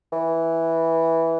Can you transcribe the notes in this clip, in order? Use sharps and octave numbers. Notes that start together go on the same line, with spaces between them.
E3